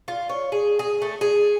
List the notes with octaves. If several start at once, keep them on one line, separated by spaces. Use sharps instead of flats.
F4
C#5
G#4
G#4
A3
G#4